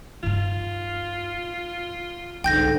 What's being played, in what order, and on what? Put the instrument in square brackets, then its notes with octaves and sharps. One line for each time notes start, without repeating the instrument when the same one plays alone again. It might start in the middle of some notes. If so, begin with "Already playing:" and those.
[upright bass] G2 D#4 [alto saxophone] F4
[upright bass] C2 [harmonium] G#2 D3 [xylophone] G5 G6 A#6